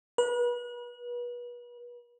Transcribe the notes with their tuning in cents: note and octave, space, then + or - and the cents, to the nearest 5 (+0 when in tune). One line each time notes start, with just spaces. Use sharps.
B4 -35